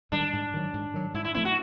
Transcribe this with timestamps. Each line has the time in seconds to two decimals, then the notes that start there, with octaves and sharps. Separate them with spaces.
0.12 G#2 D#3 G3 D4
0.33 G#2
0.54 D#3 F#3
0.74 G#2
0.94 D#3 F#3
1.14 G#2 E4
1.24 E4
1.34 F3 A3 C4 E4
1.45 F#4